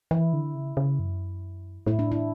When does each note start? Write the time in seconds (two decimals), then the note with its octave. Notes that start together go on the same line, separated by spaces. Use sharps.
0.11 E3 E4
0.33 D3
0.55 C#3
0.77 C#3
0.99 F#2
1.87 A2 E4
1.99 D4
2.12 E4